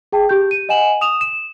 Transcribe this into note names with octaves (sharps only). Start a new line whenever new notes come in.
G#4 G5 A5
G4 G6
D#7
D#5 F#5 G#5 E7 F#7
D#6 E7 F7
E7